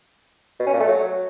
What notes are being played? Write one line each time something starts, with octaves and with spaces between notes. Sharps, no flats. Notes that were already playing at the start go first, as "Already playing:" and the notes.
B2
C#4
A#2
A3
F#3